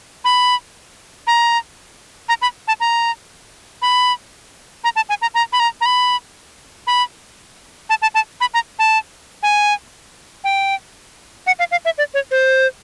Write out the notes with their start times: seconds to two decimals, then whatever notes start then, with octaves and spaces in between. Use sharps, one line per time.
0.25 B5
1.27 A#5
2.29 A#5
2.42 B5
2.68 A5
2.80 A#5
3.82 B5
4.84 A#5
4.96 A5
5.09 G#5
5.22 A#5
5.34 A#5
5.53 B5
5.60 A#5
5.81 A#5
5.86 B5
6.87 B5
7.90 A5
8.02 A5
8.14 A5
8.41 B5
8.54 A#5
8.79 A5
9.43 G#5
10.44 G5
11.47 F#5
11.59 F5
11.71 F5
11.85 E5
11.98 D5
12.14 C#5
12.31 C5